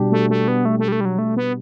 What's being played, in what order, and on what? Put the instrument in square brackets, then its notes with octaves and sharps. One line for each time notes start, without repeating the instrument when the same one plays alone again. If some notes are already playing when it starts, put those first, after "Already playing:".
Already playing: [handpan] B2 G3 D4 G4
[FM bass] A3
A3
B3
A3
A3
G3
A3
G3
F#3
A3
B3